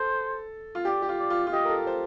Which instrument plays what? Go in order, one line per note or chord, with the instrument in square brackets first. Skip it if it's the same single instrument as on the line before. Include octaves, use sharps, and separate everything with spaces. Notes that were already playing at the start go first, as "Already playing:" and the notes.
Already playing: [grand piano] A4 [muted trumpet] C5
[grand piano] F4
[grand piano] G4 [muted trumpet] D5
[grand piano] G4
F4
[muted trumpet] D5
[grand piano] F4
F4
[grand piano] G4 [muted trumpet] D#5
[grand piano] A#4
A4
C5